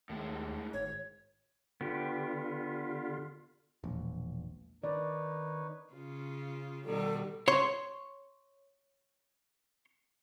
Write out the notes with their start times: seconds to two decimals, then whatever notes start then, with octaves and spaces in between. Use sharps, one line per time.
0.09 D#2 A2 G#3
0.73 G#1 C#5
1.81 D3 B3 F4 G4
3.84 E1 A#1
4.84 D#3 C4 D#4 A#4 B4 C#5 D5
5.93 C#3 F4
6.86 B2 D#3 G3 A4
7.48 C#5 C6